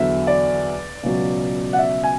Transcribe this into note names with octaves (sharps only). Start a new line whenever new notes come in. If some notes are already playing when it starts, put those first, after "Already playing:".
Already playing: E2 D3 F#3 E5
D5
C#2 B2 F#3
F#5
E5
G#5